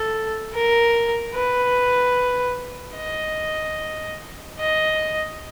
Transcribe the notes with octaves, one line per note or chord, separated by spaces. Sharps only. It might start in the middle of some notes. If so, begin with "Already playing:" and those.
Already playing: A4
A#4
B4
D#5
D#5